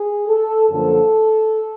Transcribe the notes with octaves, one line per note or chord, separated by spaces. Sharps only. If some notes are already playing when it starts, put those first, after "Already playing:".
Already playing: G#4
A4
F#2 D3 F3 A#3 A4